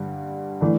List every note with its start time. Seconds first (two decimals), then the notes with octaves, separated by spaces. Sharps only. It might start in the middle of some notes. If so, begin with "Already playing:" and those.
Already playing: G2 D3 G3
0.61 E3 A3 D4